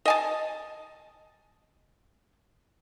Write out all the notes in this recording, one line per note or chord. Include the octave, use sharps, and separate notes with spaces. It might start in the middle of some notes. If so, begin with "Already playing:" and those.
D#5 G#5 A5